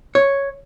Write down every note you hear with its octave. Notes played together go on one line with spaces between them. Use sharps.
C#5